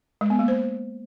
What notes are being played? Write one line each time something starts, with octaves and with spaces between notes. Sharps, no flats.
G#3
B3
A#3
C5